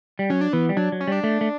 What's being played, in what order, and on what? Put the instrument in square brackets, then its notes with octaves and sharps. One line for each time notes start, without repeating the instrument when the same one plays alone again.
[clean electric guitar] G3
[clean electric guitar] F#3 [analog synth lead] C#4
[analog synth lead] D4
[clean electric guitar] E3 [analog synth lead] B3
[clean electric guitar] G3
[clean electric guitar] F#3 [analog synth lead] D4
[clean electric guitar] F#3
[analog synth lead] C#4
[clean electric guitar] G3 [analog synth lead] D4
[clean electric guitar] A3
A3